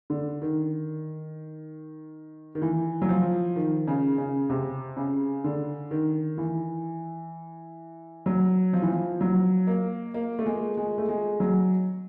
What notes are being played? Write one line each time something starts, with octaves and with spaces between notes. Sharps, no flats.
D3
D#3
D#3
E3
F#3
F3
D#3
C#3
C#3
C3
C#3
D3
D#3
E3
F#3
F3
E3
F3
F#3
A#3
A#3
A3
G#3
G#3
A3
G#3
F#3